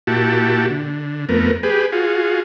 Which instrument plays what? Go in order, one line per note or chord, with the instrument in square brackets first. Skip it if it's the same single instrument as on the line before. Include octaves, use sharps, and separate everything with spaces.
[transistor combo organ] A#2 E4 F#4 G4 A5
D3
F2 A3 B3 A#4
G4 G#4 B4
F4 F#4 G#4